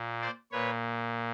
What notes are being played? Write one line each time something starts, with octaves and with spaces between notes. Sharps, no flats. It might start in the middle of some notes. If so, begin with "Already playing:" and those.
Already playing: A#2
C5 D5
A#2 B4 C#5